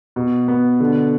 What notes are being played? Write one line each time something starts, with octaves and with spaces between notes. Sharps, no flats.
B2
B3
D3